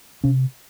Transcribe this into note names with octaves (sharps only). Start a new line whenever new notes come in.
C3 C#4